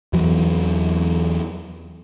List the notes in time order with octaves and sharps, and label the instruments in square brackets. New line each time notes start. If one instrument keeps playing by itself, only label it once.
[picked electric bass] E2 E3 F#3